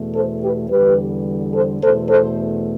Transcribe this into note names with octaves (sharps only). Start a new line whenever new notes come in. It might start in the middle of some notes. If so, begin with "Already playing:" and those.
Already playing: E2 B2 A3
A4 C5
G4 B4
E2 D3 G3 G4 B4
A4 C5
E2 B2 A3 A4 C5
A4 C5